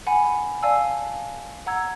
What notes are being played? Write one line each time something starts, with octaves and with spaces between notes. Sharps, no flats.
F#5 G#5 B5
D5 F5 G#5 A5 E6
F#5 A#5 E6 G#6